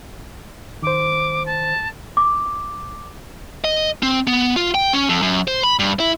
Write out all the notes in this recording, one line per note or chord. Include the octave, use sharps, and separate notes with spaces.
D#3 C5 D6
A5
D6
D#5
C4
B3
F4
G5
C#4
F2
F#2
C5
B5
G2
E4